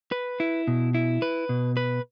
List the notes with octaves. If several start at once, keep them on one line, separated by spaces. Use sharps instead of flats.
B4
E4
B2
E4
B4
B2
B4